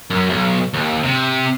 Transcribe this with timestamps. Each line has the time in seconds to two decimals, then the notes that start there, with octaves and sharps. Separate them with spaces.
0.10 F#2
0.30 B1
0.74 D#2
1.03 C3